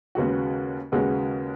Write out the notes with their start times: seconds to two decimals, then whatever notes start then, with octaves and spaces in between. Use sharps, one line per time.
0.15 D#2 C#3 G#3 B3 F#4
0.92 D#2 C#3 G#3 B3 F#4